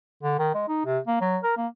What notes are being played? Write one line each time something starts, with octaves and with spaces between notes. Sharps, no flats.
D3
D#3
G#3
D#4
C3
A#3
F#3
A#4
A#3